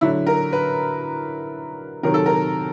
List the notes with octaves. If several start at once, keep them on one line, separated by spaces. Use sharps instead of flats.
D3 F#3 E4
A#4
B4
C3 D#3 F#3 A#4
A4
A#4